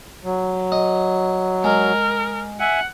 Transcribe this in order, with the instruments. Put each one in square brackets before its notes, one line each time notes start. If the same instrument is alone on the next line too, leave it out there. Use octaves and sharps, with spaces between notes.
[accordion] F#3
[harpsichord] D#5
[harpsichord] G#3 [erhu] A#4
[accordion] E5 G#5 [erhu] F#5